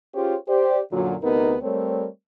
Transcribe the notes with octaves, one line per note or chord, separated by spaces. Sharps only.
C#4 F4 G4 G#4 C5 C#5
G4 C5 D5
F#2 A#2 D3 F#3
D2 C3 B3 D#4 A#4
G3 A3 C4 A#4 C#5